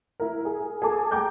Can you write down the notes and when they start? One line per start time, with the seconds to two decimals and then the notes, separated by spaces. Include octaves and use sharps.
0.20 E4 A#4
0.45 G#4
0.82 G#4 A4 A5 D6
1.11 G5 A#5 D6 G6 G#6